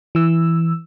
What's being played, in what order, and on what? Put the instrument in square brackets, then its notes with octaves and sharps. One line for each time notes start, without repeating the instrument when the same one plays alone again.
[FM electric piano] E3 E6